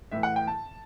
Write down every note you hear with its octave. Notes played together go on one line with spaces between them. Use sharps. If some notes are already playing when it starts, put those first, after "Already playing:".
A2 E3 A3 E5
F#5
G5
A5